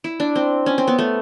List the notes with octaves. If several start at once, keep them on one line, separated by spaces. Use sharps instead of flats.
E4
D4
C4
C#4
C4
B3
A3